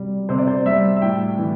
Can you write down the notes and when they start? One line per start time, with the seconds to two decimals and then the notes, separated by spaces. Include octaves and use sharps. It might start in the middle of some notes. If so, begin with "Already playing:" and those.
Already playing: C3 G3
0.29 C3 C5
0.38 D5
0.48 C5
0.66 G3 E5
0.96 E5
1.02 A2 G5
1.38 E3